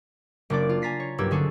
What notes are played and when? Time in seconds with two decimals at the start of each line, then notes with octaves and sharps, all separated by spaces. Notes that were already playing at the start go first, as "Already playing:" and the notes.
0.50 F#1 A#3 D4 D5
0.69 F4
0.82 G#5 A#5 A6 B6 C7
1.00 C#5
1.18 B1 G2 A#3 G4 E6 G#6
1.31 D3 C#4 G#4 A4